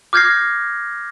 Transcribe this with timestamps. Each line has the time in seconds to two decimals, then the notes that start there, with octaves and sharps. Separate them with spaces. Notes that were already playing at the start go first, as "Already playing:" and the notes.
0.13 D6 F6 G6 G#6 A#6 C7